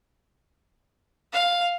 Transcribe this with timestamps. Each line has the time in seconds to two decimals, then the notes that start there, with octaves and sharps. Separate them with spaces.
1.33 F5